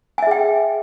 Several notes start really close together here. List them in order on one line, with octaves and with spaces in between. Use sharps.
G#5 E5 G#4 G5